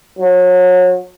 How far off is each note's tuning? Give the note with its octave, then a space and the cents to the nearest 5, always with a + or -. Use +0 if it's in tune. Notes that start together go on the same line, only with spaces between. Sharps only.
F#3 -30